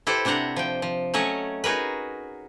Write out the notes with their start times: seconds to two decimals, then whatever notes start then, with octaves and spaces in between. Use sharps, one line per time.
0.07 E4 G4 A4 B4 C5
0.25 C3 D4 C5 F#5 A#5
0.56 F3 G5
0.82 F3
1.14 F#3 A3 C#4 C#5 D#5
1.64 D#4 F#4 G#4 A#4 B4